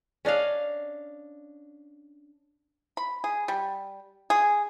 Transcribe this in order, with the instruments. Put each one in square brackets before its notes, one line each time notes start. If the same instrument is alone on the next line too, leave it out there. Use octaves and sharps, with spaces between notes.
[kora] C#4 D4 D#5 F5
[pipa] B5
G#4
G3
G#4